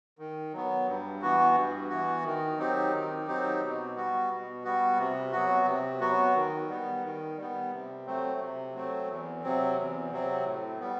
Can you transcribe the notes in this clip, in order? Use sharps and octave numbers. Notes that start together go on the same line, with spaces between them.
D#3
F#3 B3
G2
E3 B3 F#4
G2
E3 B3 F#4
D#3
F#3 C4 D#4 G4
D#3
F#3 C4 D#4 G4
B2
G3 B3 F#4
B2
G3 B3 F#4
C3
F#3 B3 F#4
C3
F#3 B3 F#4
D#3
G3 B3
D#3
G3 B3
C3
F#3 A3 C4
C3
F#3 A3 C4
E2
C3 F#3 C4
E2
C3 F#3 C4
A2
G3 B3